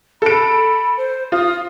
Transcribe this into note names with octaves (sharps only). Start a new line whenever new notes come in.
A4 B5 D7
C5
F4 D#6